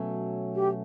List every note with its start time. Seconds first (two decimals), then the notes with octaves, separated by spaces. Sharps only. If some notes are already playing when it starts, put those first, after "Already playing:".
Already playing: B2 F#3 A3 C#4
0.55 G4